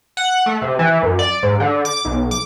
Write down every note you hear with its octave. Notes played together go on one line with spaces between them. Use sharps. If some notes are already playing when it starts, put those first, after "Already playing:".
F#5
A3
C3
E3
F#2
D5
G#2
D3
D6
B1
D6